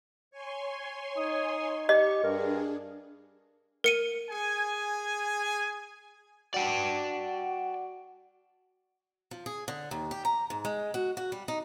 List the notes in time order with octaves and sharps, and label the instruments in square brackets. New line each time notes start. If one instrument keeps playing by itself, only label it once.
[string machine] C#5 G#5 C6
[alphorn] D#4 [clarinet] D#6
[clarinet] G4 [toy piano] D#5 [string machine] C#6
[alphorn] G2 [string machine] D4 G#4 [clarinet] A#4
[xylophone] A#4 C#7 D#7
[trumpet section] G#4 G#5
[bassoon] F#4 [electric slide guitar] D5 G5 A5
[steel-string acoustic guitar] F3
G#4
D3
D#2
G4
A#5
G#2
G#3
F#4
F#4
G3
D#4